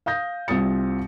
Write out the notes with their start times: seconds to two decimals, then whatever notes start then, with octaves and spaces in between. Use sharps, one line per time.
0.06 F5 D#6 G6 A#6
0.48 C2 C4 F4 D#6 A6 C#7